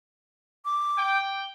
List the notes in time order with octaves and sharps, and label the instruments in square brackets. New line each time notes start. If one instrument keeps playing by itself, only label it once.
[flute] D6
[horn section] G5